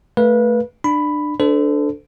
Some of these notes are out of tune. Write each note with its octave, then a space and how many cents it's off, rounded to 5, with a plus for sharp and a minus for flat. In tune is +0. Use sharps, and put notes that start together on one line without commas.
A3 +0 B4 -25 F5 -5
D4 +25 B5 +5
D4 +0 A4 +0 C5 -45